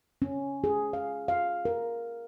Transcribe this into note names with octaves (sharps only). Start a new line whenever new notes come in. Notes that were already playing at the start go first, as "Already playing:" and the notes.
C#4
G#4
F5
F5
A#4